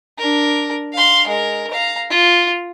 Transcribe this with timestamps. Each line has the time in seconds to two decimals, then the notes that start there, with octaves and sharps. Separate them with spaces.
0.18 D4 A#4
0.93 F5 C6
1.27 G#3 A#4
1.71 F5 A#5
2.10 F4